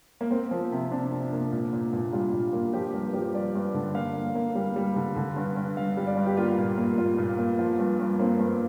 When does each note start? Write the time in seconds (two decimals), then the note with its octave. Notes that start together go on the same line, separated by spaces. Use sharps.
0.21 A#3
0.31 A#3 C4
0.51 F3
0.71 C3
0.91 C3 D4
1.12 C3
1.32 A#3
1.52 A#2
1.73 A#2
1.93 A#2
2.13 G3 F4
2.33 A#2
2.53 A#3
2.73 F3 G4
2.94 G2 A#4
3.14 F3 G4
3.34 G2 D5
3.55 G2
3.74 D3
3.95 A#3 F5
4.15 A#3
4.35 A#3
4.55 G3
4.76 G3
4.96 D3
5.16 D3
5.36 G2
5.56 G2
5.77 G2 F5
5.97 G3
6.07 D5
6.17 G2
6.26 G4
6.37 A#3 F4
6.58 A#2
6.78 A#3
6.98 A#2 F4
7.18 A#2
7.38 A#3
7.59 F3 F4
7.79 G2
7.99 G2
8.19 A#3 C4
8.39 G2